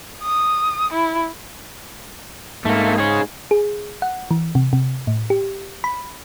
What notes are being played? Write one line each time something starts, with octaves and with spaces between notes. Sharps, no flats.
D#6
E4
G#2 A3 A#3
G#4 C#5
G#4
F#5
E3
C3
C3
A2
G4
B5